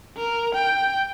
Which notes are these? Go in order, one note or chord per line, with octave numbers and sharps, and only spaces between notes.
A#4
G5